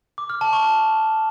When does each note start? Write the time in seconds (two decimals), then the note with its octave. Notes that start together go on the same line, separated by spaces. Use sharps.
0.18 D6
0.30 F6
0.41 A5
0.53 C#6